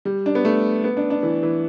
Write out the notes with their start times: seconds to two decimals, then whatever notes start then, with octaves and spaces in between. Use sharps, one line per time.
0.05 G3
0.26 D4
0.35 B3
0.45 A3
0.84 B3
0.97 D4
1.10 D4
1.23 E3
1.43 E3